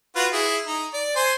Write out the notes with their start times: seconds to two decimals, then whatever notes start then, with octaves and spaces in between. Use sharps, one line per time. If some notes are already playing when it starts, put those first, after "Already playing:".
0.16 F4 F#4 B4
0.33 E4 G#4
0.67 D#4
0.94 D5
1.16 C5 G#5 C6